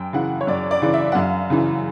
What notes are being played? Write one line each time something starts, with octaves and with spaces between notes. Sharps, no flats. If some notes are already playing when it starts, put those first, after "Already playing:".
Already playing: F#2 G5
C#3 E3 F#5
C#5
F#2 D5
D5
C#3 E3
E5
F#5
F#2 F5
C#3 E3